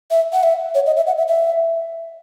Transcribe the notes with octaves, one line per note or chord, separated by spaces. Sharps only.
E5
F#5
E5
C#5
D#5
E5
F#5
E5
E5